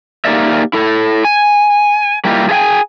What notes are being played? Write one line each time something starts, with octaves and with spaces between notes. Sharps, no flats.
A#3 D#4 G4 A#4 D5 E5
E4 A4
G#5
G3 A#3 E4 F4 G4
G#4 A4 E5 G5 G#5